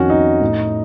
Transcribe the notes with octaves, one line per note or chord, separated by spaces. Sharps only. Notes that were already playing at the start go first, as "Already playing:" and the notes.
Already playing: F2 D#3 C#4 F#4
D#4
A2